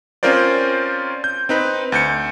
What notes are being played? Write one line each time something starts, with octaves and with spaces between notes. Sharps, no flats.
C4 C#4 F4 A#4 C5 D5
G6
C4 D#4 B4
D2 G6 C#7